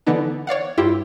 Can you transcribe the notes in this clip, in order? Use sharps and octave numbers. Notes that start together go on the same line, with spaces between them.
D3 E3 B3 D4 D#4
C#5 D5 F5 F#5
G2 E4 F4 G4